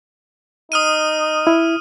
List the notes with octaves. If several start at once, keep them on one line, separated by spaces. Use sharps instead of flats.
D#4 D#6 F6 D#7
E4